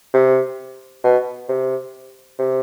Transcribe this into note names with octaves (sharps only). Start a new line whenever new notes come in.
C3
B2
C3
C3